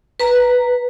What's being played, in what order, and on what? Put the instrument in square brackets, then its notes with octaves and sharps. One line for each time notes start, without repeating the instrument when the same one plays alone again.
[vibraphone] B4 A#5